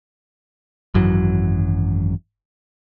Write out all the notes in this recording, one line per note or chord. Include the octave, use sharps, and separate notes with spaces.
G#1 F#2 E3 F#3